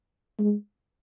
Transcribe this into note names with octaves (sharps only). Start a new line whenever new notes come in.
G#3